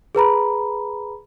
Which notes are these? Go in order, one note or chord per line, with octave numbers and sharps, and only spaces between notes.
G#4 B4 A#5 B5